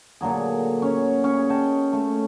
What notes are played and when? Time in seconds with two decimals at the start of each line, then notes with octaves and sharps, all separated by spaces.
0.21 A#2 D3 F#3 G#4
0.82 C#4 C#5
1.24 C#4 G#4
1.50 D#5 G5 A5
1.93 A3